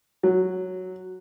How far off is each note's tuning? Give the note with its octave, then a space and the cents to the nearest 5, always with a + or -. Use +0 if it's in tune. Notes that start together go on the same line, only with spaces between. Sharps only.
F#3 -5